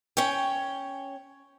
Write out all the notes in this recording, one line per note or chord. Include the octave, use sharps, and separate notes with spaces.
C#4 C#5 G5